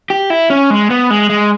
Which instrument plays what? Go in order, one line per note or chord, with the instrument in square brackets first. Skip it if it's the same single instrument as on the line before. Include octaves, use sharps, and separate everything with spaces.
[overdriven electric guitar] G4
E4
C#4
G#3
B3
G#3
G#3